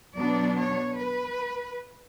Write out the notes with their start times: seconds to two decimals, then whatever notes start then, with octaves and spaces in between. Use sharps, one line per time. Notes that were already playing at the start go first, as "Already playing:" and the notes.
0.16 B2 F#3 B3 D4 D5
0.58 C#5
0.98 B4